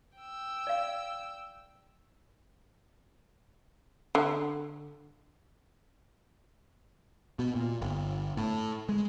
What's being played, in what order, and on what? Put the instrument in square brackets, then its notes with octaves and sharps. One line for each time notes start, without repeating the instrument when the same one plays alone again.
[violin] G5 E6
[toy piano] D5 F5
[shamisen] D3
[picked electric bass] B2
A#2
G1
A2
G#3